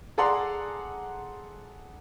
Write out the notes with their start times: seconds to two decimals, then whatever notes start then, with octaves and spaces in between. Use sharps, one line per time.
0.18 G#4 A4 D5 F#5 A#5 C6